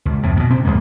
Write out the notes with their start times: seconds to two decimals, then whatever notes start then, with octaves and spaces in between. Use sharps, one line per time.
0.05 C#2
0.23 F2 A2
0.36 G#2 B2
0.50 C3 C4
0.65 A#1 F2 G#2 A#3